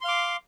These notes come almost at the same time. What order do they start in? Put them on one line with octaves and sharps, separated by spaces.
C6 F5 D6